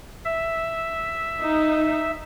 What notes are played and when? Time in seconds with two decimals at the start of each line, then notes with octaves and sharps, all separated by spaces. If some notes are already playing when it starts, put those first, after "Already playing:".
0.25 E5
1.42 D#4